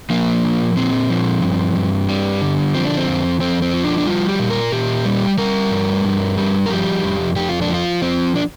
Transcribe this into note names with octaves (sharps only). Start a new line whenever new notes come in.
F3 A#3
A#2
A#2 C4
F3
G2
G2
G3
D3
F3 C4
D4
C4
F2
F2 C4
C4
F3
D4
D4
G3 F4
G4
A#2
A#4
A#2 G4
G3
G3 A#4
G2
G2
G3
A#4
F3 G4
F2
F2 G4
F4
D4
F3
F4
F3 C4
D4